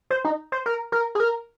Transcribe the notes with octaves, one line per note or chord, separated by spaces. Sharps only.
C5
D#4
C5
A#4
A#4
G#4
A#4